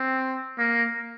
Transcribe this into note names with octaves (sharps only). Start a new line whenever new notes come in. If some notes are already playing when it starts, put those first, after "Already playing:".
Already playing: C4
A#3